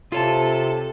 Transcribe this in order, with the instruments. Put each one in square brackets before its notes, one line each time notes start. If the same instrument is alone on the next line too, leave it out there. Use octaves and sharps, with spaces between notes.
[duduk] C3 [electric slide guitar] F4 C#5 A5 [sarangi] A4